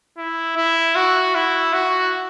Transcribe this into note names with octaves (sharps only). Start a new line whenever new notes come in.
E4
E4
F#4
E4
F#4